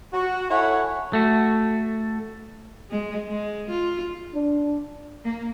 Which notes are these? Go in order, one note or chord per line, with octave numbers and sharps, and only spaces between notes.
F#4
E4 A4 C#5 F#5 G#5
A3 F#4
G#3
G#3
F4
D4
A#3